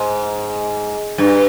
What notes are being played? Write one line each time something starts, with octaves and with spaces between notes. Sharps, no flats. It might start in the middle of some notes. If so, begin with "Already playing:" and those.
Already playing: G#2
G2